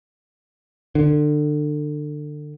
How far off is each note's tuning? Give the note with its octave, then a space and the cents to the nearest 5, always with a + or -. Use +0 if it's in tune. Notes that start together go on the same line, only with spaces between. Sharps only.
D3 +25